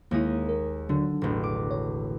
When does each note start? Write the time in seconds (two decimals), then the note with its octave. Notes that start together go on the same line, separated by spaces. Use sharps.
0.11 D#2 G#3 A#3 E4 D#6
0.49 A#4
0.89 D3 F#3 D4
1.22 E1 A1
1.44 D6
1.71 C#5